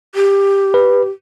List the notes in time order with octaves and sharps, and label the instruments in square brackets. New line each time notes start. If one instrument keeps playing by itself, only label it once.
[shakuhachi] G4
[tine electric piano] B4